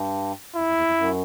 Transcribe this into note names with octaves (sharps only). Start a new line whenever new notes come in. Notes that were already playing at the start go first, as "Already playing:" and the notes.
Already playing: G2
F2 E4
F2
E2
F2
F#2